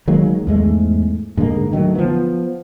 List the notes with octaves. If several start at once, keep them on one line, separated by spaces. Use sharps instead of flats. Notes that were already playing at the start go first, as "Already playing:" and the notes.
D#3 F#3 G#3 A#3
E2 G#2 G#3 A3
G#2 D3 G#3 A#3
D3 D#3 F#3 A3
F3 B3